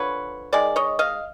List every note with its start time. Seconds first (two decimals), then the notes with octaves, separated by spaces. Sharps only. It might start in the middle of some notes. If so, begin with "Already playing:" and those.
Already playing: D3 F3 B4 C#5
0.53 D#3 G#3 D5
0.76 C#5 D#5
0.99 D#5 F5